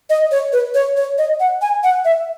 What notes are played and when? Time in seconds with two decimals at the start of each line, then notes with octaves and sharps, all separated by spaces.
0.10 D#5
0.31 C#5
0.53 B4
0.75 C#5
0.97 C#5
1.18 D#5
1.40 F#5
1.62 G#5
1.84 F#5
2.05 E5